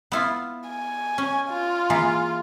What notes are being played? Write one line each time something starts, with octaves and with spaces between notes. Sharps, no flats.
B3 E4 F4
G#5
C#4
F4
E3 A#3 G#4